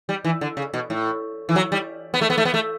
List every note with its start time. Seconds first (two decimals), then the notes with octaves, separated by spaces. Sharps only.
0.09 G3
0.24 E3
0.41 D3
0.57 C#3
0.74 B2
0.90 A2
1.49 E3
1.56 F#3
1.72 G3
2.14 B3
2.21 A3
2.30 B3
2.38 A3
2.45 B3
2.54 A3